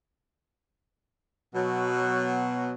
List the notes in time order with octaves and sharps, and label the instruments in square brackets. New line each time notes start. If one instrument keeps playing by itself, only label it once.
[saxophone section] B2 F#3